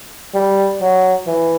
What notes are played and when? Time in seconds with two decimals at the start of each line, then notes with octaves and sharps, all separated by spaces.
0.34 G3
0.81 F#3
1.27 E3